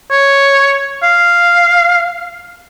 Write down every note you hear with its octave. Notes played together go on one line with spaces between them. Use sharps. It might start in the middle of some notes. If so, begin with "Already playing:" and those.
C#5
F5